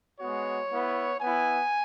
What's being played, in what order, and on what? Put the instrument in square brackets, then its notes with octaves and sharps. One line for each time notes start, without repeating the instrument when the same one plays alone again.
[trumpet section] G#3 B3 F#4 C#5
B3 E4
B3 E4 G#5